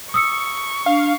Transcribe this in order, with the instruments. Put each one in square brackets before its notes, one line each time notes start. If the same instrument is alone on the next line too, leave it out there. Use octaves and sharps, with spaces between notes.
[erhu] C#6 [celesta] D#6 E6 C#7
[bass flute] D4 [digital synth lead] F5